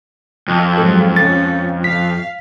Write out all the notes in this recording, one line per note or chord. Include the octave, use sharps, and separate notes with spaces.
F2
G#2 F#3 A4
C#4 A6
F5 B6